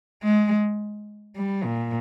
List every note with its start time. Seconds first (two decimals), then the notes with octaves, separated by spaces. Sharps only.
0.23 G#3
1.36 G3
1.65 A#2